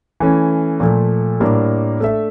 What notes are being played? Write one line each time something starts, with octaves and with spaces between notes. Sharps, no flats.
E3 A3 C#4
A#2 F3 A3
A2 G3 A#3 D4
A3 D4 A4 E5